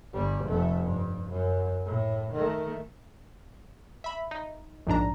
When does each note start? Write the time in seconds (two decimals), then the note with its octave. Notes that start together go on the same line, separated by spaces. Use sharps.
0.13 G1 G3
0.45 F1 A3
0.83 G2
1.31 F#2
1.86 A2
2.32 D#3 A3
4.04 E5 B5
4.31 D#4
4.87 A#1 G#2 D4 A#5